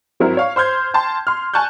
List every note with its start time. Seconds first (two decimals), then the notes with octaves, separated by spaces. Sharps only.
0.20 G#1 F#3 C4 E4 A#4
0.37 C#5 F5 C#6
0.56 C5 C6 F6 G6 G#6
0.94 G5 A5 C6
1.27 C6 F6
1.54 G#5 A5 C#6 F#6 G6